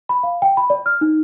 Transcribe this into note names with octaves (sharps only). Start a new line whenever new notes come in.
B5
F5
G5
B5
D5
F6
D#4